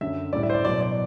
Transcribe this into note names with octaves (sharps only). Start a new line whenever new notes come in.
F#2 D3 F#3 E5
A2 G3 D5
E5
C5
D5
B2 F#3 D5
D5